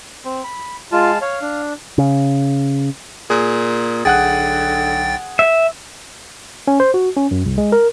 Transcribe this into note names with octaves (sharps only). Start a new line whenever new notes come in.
C4
B5
G#3 F4 F5 A5
C#5 F5
D4
C#3
A#2 G#4
B1 D3 G#4 F#5 G5 F#6 A6
E5
C#4
C5
F#4
C#4
F#2
C2
G#3
A#4